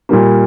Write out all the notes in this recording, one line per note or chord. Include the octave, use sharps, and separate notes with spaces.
A#2 G3 A#3